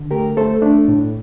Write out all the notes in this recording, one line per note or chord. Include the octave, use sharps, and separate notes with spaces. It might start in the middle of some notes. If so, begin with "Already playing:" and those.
Already playing: D3
A3 G4 A#4
A3 A4 C5
A3 D4
A2